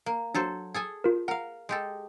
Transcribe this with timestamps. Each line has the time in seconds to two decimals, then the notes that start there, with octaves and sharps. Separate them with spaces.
0.06 A#3
0.34 F#3 D4 F#4 A4 C5
0.74 G#4 A4 G#5
1.04 F4 A#4
1.28 A#4 F5 F#5
1.69 G#3 G4 A4